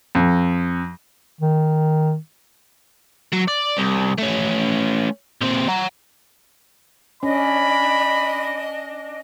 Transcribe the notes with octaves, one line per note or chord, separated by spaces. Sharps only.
F2
D#3
F#3
D5
C2
A3 C#4
A#2 C4
F#5 A#5
C#4 D4 D#5 B5